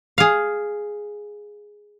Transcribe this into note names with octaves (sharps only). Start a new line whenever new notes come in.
G#4 F5